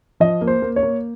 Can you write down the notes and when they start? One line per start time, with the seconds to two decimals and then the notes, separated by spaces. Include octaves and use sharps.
0.20 F3 D#5
0.41 A#3
0.47 C5
0.62 A#3
0.76 C#5
0.83 A#3